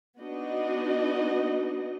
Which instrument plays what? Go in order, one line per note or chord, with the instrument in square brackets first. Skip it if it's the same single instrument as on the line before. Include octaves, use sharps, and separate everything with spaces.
[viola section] B3 D4 D#4 F#4 D#5